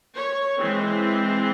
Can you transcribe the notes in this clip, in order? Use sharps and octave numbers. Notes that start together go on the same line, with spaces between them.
C#5
E3 G#3 C4